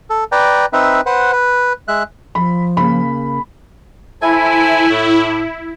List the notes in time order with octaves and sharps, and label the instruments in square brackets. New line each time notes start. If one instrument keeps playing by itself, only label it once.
[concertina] A4
B4 D5 G5 A#5
C4 D#4 B4 E5
B4 C5 F#5
B4
G#3 E5 F#6
[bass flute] F3 [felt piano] B5
[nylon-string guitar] C#3 A#3 [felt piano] B5
[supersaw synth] E4 [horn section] A4 C5 G#5
[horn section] A2